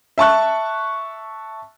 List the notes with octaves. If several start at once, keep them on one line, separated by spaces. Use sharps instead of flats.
E5 A5 C#6 F#6